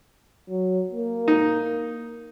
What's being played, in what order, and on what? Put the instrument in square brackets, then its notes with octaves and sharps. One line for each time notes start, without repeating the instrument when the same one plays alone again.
[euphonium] F#3
A#3
[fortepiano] D#4